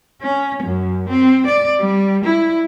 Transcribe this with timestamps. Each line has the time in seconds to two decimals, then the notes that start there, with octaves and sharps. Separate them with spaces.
0.21 C#4
0.63 F#2
1.09 C4
1.47 D5
1.80 G3
2.25 E4